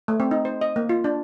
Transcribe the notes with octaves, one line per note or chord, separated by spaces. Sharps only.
A3
C4
D#4
C5
D#5
A#3
F4
D4